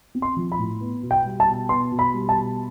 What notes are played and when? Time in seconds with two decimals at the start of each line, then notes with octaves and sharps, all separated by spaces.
0.15 C4
0.22 C6
0.36 F3
0.52 B5
0.59 A2
0.81 B3
1.03 B2
1.11 G5
1.25 G3
1.40 A5
1.47 B2
1.69 B3 C6
1.92 B2
1.99 B5
2.14 G3
2.29 A5
2.36 B2